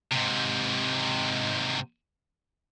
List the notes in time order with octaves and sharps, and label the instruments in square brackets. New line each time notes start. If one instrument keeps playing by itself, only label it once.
[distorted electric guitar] G#2 C3